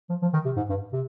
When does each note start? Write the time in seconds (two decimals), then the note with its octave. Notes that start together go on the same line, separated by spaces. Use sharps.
0.10 F3
0.22 F3
0.33 D#3
0.45 C3
0.56 G#2
0.69 G2
0.93 C3